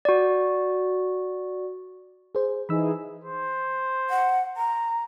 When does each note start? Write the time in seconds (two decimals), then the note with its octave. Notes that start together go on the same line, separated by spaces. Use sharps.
0.05 F#4 D5
2.35 G#4 C5
2.69 E3 D#4 G#4 B5 E6
3.24 C5
4.10 F#5
4.57 A#5